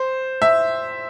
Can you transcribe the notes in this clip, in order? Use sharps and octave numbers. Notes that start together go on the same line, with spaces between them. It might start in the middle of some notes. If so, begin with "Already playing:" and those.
Already playing: C5
E5